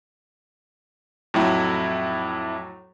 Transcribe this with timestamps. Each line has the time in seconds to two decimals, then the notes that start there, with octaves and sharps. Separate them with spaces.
1.34 F2 A2 F#3 E4